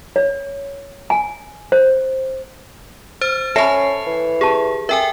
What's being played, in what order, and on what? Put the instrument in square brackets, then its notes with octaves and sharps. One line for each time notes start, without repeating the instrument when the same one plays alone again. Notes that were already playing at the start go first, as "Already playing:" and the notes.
[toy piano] C#5
G#5
C5
[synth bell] C5 F6 A6
[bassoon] C#4 [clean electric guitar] A4 C#5 [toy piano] E5 G#5 B5 [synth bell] A5 C7
[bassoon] E3
[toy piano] G4 A5 [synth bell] G#4
[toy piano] A4 A#4 [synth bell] E5 G5 G#5